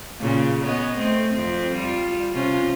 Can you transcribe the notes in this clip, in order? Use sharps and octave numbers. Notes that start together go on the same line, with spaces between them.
A#2 C#3
B3 C#5 D#5
A3 C4
F2 C4
G3 F4
C3 C#4 F4